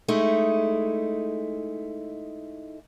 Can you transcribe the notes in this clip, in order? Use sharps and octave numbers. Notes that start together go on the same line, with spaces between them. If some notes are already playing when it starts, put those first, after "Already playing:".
G#3 A3 D#4 E4